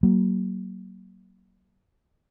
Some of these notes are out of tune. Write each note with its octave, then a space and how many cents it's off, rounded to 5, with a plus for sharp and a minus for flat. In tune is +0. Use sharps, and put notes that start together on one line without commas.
F#3 +30 A#3 +0